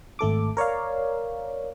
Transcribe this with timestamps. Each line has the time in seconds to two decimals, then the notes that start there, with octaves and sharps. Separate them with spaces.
0.19 G#1 A3 A4 D6
0.57 A#4 C#5 D5 F5